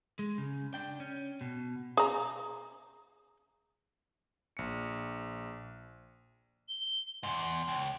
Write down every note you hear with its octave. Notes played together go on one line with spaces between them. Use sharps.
G#3
C#3
D4 G5
C#4
B2
G#4 A#5
A#1 C#7
G7
E2 G#2 C6
C#2